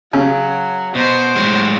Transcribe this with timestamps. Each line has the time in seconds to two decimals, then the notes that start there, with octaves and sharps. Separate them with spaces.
0.13 C#3 F#3
0.95 B2 C5
1.36 A2 F#3 G#3